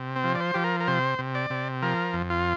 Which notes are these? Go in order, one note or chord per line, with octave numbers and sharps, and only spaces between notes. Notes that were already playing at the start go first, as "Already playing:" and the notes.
Already playing: C3
C4
F3
D5
C5
F3 G4
A#4
A#4
C3 C5
C3
D5
C3
F3 A#4
F2
F4